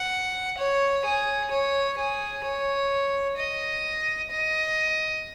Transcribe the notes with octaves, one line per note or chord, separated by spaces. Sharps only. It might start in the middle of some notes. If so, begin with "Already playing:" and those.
Already playing: F#5
C#5
G#4
C#5
G#4
C#5
D#5
D#5